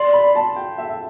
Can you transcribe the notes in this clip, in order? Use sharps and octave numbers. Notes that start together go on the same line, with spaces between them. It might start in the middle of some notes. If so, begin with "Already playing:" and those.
Already playing: D5 C6
B5
A5
G5
E5
E5